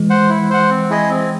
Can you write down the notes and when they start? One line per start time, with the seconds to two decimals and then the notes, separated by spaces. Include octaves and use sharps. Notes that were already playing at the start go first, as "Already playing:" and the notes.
Already playing: E3 G#3
0.10 C5 F#5
0.29 E4
0.50 C5 F#5
0.70 C4
0.90 E4 G#4 D#5
1.10 C4